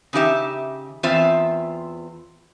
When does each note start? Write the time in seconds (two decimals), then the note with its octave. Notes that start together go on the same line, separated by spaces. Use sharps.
0.13 C#3 D#4 G4 E5
1.03 E2 C4 F4 C5 E5